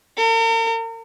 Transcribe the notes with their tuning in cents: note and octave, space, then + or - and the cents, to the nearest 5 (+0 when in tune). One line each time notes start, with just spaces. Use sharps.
A#4 -45